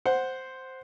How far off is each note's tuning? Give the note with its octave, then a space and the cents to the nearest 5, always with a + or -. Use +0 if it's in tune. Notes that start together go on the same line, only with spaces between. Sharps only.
C5 +0 F#5 +0